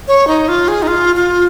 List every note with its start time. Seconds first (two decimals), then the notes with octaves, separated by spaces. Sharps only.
0.08 C#5
0.27 D#4
0.48 F4
0.68 G#4
0.83 D#4
0.88 F4
1.15 F4